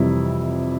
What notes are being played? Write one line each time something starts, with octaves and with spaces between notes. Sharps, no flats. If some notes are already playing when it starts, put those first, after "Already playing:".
Already playing: F2 C3 E3 G3 E4